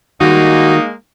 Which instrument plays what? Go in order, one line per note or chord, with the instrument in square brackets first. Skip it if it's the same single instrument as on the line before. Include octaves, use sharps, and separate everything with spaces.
[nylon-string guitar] D#3 G3 [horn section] G#3 A#3 [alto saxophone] D#4 [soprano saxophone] F#4